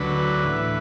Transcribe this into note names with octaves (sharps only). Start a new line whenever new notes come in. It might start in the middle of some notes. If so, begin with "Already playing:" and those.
Already playing: D2 D3 F#3 B4
A2 E3